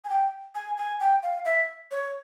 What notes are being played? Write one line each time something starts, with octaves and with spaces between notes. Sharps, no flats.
G#5
G5
G#5
G#5
G5
F5
E5
C#5